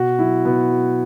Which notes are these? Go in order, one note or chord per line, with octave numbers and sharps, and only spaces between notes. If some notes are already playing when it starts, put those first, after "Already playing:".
Already playing: B2 F#4
F#3 E4
B2 B3
F#3